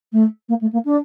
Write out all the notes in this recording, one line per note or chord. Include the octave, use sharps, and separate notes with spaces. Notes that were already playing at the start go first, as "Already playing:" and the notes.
A3
A#3
A3
A#3
D4